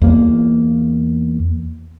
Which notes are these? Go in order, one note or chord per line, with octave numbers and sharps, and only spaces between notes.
E2 A#3